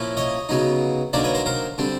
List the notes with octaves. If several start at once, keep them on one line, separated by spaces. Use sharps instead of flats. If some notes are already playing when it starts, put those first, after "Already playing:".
Already playing: A#2 F3 A#3 C#4 E4
C#5 D#5
C#3 F#3 B3 D#4
D3 F#3 A#3 D#4 C5 D5
B4 C#5
A#4 C5
A#4 C5
D3 G3 C4